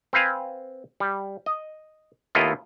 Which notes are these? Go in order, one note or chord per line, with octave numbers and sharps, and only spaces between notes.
C4 B4 F5 G#5
G3
D#5
D#2 A3 B3 E4 F4 D#5